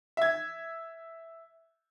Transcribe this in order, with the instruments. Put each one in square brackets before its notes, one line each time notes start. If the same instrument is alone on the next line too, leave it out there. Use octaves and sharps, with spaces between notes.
[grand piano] E5 G#6